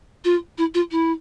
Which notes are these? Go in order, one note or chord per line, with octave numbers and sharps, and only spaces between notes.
F4
E4
F4
E4